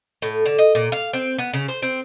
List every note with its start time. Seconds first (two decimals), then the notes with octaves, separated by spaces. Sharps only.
0.22 A2
0.46 D3
0.58 D#5
0.75 A#2
0.92 F5
1.13 C4
1.38 B3
1.53 C#3
1.68 C5
1.82 C4